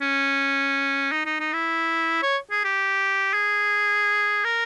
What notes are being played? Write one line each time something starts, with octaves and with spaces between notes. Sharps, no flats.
C#4
D#4
D#4
D#4
E4
C#5
G#4
G4
G#4
A#4